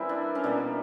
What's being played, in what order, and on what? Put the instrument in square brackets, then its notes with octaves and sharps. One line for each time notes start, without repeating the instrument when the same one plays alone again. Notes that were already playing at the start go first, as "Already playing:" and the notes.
Already playing: [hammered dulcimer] E3 G3 C4 E4 A#4
D4
C#4
B2 G3 A#3 D4